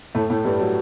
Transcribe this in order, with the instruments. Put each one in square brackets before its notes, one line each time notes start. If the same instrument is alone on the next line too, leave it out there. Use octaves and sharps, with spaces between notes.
[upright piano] A2 A3
A2 A3
G2 G3
F#3